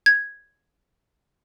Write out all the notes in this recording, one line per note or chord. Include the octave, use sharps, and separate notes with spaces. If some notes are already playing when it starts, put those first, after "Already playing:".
G#6